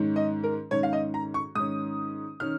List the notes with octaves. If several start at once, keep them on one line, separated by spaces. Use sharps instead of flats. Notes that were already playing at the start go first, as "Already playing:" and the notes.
Already playing: G#2 D#3 C#4
D#5
A#4
G#2 D#3 C#4 C#5
F5
D#5
A#5
C#6
G#2 D#3 C#4 D#6
D#3 C#4 F6